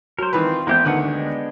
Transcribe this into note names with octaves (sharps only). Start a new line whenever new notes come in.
F#3 A#4 C5
D#3 E3 C4 F4 B4
A1 A#3 B3 G4 C5 G6
D2 D3 D#3 B4 F#5
G#3 B3 D4